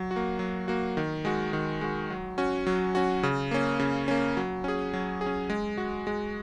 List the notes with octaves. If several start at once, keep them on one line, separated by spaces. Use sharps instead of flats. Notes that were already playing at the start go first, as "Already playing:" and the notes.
Already playing: F#3
F#4
A#3
F#3
A#3 F#4
D#3
G#3 F#4
D#3
G#3 F#4
F#3
C#4 F#4
F#3
C#4 F#4
C#3
A#3 C#4
C#3
A#3 C#4
F#3
C#4 G#4
F#3
G#4
C#4
G#3
F#4
G#3